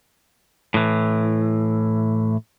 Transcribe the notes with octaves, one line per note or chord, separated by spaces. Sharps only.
A2 E3